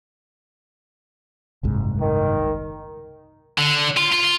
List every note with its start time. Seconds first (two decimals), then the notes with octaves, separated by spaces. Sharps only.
1.63 F#1 C2 G#2
2.00 D#3
3.58 D3
3.97 F4
4.12 F4
4.24 F4